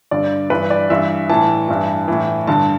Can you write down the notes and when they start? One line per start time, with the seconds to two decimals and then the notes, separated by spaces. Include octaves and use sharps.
0.11 G2 D3 D5
0.50 G2 E3 B4
0.70 D5
0.90 G2 E3 E5
1.29 A2 E3 A5
1.68 G2 E3
2.08 A2 E3
2.47 G2 D3 A5